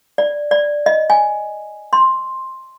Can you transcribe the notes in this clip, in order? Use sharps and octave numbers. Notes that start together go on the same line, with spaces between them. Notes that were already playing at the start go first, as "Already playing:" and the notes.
D5
D5
D#5
G#5
C6